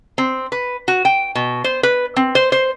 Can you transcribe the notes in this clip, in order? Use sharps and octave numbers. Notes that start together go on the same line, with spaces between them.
C4
B4
F#4
G5
B2
C5
B4
C4
C5
C5